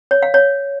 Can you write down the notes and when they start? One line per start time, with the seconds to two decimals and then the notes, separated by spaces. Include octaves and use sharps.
0.11 C#5
0.22 F5
0.34 C#5